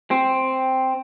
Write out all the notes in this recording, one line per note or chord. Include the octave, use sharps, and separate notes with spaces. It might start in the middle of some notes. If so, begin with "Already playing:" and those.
C4